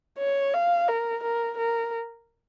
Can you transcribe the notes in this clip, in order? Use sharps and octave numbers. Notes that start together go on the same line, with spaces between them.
C#5
F5
A#4
A#4
A#4